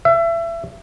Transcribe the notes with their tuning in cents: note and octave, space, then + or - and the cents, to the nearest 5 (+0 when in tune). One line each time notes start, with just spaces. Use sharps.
E5 +30